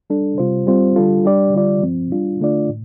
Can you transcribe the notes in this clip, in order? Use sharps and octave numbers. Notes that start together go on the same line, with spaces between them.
G3 D4 A4
C3 G3 F4 C5
G3 C4 F4 C5
D3 G3 D4 F4 A4
G3 D4 G4 D5
D3 G3 F4 D5
G2 F3 C4
G3 D4 F4
D3 A3 D4 F4 D5
A2